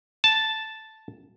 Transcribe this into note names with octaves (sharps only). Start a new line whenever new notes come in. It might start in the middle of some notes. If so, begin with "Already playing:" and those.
A5